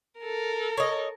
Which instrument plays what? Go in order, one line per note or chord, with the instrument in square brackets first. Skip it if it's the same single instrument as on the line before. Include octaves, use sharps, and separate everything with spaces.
[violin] A4 A#4
[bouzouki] C#5 D#5